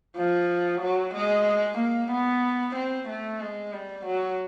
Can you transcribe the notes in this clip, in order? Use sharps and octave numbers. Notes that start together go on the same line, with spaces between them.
F3
F#3
G#3
A#3
B3
C4
A3
G#3
G3
F#3